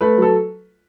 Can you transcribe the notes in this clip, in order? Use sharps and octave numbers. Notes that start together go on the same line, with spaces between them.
A3 B4
F#3 A4